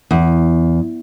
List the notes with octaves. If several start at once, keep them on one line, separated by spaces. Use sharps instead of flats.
E2